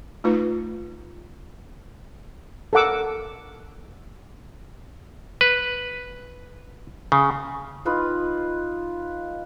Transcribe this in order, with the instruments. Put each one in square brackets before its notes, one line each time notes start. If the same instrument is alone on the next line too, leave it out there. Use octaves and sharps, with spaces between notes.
[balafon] A3 D#4 F4 B4
[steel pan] A4 A#4 F#5 D6 E6
[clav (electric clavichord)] B4
C#3
[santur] D#4 F4 B4